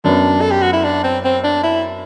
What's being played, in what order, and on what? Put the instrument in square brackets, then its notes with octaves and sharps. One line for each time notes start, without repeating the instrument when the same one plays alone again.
[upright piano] F#2 F#3 B3 [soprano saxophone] D4
[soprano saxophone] A4
G4
F#4
E4
D4
C4
C4
D4
E4